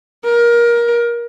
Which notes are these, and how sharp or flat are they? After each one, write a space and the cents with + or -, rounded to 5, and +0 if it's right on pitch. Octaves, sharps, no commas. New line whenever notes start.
A#4 +20